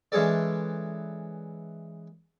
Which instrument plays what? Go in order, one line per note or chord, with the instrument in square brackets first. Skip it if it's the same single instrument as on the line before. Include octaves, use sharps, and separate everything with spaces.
[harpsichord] E3 G#3 C#4 G#4 A4 D5